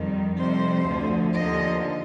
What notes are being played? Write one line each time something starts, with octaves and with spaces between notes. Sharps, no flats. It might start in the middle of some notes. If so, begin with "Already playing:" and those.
Already playing: F2 D#3 G3
F2 C3 G3 C5
D2 D3 F3
D#2 D3 F3 D#5